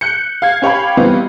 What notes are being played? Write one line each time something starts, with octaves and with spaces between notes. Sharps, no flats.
F#6 G6 C#7
F5 G#6
C#4 G4 C#5 F5 G5 B5
E3 G3 B3 C4 D#4 F4